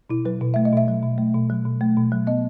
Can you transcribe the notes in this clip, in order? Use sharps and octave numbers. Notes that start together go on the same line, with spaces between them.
B2 E4
F#3 B4
B2
A3 E5
D#5
B2 E5
F#3
B2
A3
B2
F#3
B2
A3
B2
F#3
B3 D#5